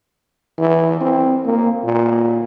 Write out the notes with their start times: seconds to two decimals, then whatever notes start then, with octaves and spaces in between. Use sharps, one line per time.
0.58 E3
1.01 C4
1.46 A#3
1.84 A#2